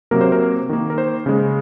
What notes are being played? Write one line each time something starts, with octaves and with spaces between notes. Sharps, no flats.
C3 F#3 A#3 A#4
C5
A#4
D#3 A#3
A#4
C5
C#3 G#3